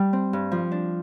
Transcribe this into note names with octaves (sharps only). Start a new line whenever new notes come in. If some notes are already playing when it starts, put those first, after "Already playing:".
Already playing: G3 G4
C4
G2
F3
D4